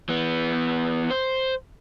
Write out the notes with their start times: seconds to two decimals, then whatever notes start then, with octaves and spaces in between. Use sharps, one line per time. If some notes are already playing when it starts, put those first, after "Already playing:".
0.09 E3 B3
1.10 C5